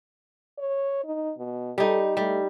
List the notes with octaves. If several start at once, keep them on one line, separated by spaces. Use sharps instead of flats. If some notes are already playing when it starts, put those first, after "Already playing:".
C#5
D#4
B2
G3 D#4 A4
G3 A3